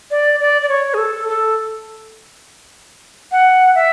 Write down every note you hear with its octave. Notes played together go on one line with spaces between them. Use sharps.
D5
D5
D5
C#5
G#4
A4
A4
F#5
E5